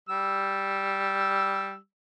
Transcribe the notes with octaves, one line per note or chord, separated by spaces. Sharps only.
G3 E6